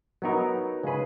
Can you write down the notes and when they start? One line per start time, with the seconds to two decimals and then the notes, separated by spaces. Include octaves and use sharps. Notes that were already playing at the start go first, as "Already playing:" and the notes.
0.22 F#3 B3 D#4 A#4
0.83 C#3 G#3 C#4 G#4 B4